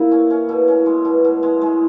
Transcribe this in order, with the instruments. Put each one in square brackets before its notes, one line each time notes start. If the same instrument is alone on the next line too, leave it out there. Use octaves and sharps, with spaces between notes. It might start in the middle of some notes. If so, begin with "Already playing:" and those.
Already playing: [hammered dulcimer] A#2 [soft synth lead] E4
[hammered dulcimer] C#4
C#4
B2
C#4
G#3
B2
B2
G#3
G#3